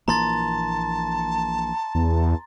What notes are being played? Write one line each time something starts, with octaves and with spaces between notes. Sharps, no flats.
A#1 E3 A#3 A5 A#5 C6 A6
E2